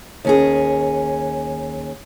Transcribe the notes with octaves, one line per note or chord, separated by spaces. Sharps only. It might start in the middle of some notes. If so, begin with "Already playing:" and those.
D#2 C#4 G#4